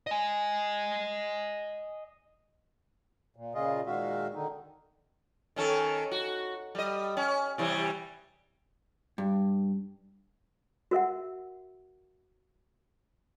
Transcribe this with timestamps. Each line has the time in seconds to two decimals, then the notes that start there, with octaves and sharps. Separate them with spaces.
0.07 D#5 G#5
3.36 A#2
3.55 A#2 C#3 F4 G#4 D#5
3.86 A#2 D#3 G#3 F#4 E5 F5
4.35 D3 D#3 D#4
5.56 D#3 C#4 A4
6.11 F#4
6.75 G3 D#5
7.17 C#4
7.58 C3 E3 G3
9.18 G2
10.91 F#4 A#4 E5 F#5